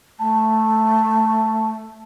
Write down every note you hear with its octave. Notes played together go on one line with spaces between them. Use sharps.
A3 A5